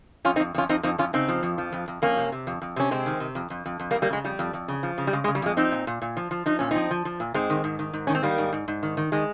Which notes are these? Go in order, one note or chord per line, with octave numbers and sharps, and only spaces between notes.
F2 C#4 F4
C4 D#4
F2
F2 C#4 F4
F2 C4 D#4
F2 C4 D#4
F2 C#4 F4
C#3 C4 D#4
F3
F2
F3
F2
F2
F2 A#3 C#4
C3
C3
F2
F2
C3 C#4
C3 G#3 C4
D#3
C3
F2
F2
F2
F2
G3 A#3
F2
G3 A#3
C#3 G#3
F2 G3
F2
F2
C#3
F3
C#3
G3
C#3 G#3
G#3
C#3
G3
F2 G#3
F3 C4 D#4
A#2
A#2
A#2
F3
F3
F3 D#4
A#2 C#4
F3 C4 D#4
F3
F3
A#2
G#2 G#3 C4
D#3
G#2
D#3
G#2
D#3 C#4
C4
D#3 G3 A#3
G#2
G#2
G#2
D#3
D#3
D#3 G#3